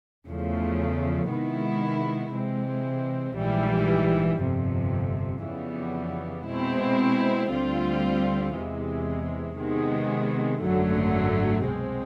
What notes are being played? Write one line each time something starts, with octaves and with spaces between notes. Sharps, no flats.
E2 C#3 F3 A3
C3 D#3 G#3 B3 E4
C3 E3 G#3 C4
A#1 G#2 E3 G3
G1 F2 C3
F2 C#3 E3 G3 B3
B2 G#3 C4 E4
D2 D3 G3 C4 F4
E2 C3 E3 G#3
C3 D#3 G#3 B3
G#1 F#2 D3 F#3 A3
C2 B2 G#3 C4